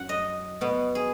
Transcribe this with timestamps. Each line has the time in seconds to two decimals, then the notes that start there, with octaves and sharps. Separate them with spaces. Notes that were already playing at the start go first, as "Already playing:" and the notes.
Already playing: F#2 F#5
0.09 D#5
0.61 B2 B3
0.95 G#4